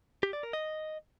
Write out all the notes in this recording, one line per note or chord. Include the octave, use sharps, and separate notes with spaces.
G4
D5
A#4
D#5